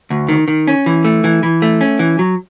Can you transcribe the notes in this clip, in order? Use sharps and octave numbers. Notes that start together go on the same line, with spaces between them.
D2
D#3
D#3
C#4
E3
A3
E3
E3
A3
C#4
E3
F#3